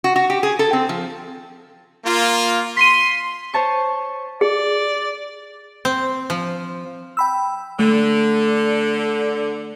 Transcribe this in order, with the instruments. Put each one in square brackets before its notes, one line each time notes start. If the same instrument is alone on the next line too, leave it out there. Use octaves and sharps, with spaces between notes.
[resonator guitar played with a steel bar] F#4
F#4
G4
G#4
A4
C4
F3
[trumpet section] A#3 F4
[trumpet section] C6 [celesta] B6 D#7
[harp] C5 C#5 A5 C#6
[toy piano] G#4 [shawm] D5
[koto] C4
F3
[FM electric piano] G5 B5 E6
[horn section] D3 [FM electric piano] A3